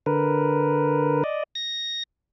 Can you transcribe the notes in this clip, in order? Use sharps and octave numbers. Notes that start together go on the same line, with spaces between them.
D3 A#4 B4
D5 D#5
A#6